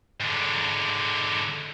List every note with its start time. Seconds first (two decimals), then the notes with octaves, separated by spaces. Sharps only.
0.20 G#2 D3